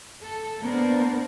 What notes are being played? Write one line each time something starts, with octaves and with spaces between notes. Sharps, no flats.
A4
A#3 B3 D4 A#4 C5